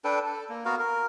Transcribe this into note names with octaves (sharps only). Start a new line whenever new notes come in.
D4 A4 B4 G5
A4
A#3
B3 F#4 A#4 F5
A#4